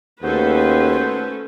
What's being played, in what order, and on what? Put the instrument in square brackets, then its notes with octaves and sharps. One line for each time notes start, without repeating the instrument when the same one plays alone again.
[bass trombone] D#2 [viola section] A3 C#4 A4 [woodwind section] F#4 G#4 C5 [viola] B4